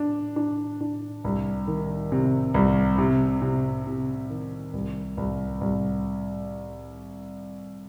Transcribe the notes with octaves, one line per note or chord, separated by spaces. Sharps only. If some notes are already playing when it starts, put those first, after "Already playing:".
Already playing: D4
D4
D4
C2
D#3
C3
C2
C3
C3
C3
D#3
C2
C2
C2